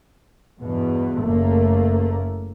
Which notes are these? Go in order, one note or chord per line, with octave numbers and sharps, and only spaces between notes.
E2 G2 B2
F#1 A3 A#3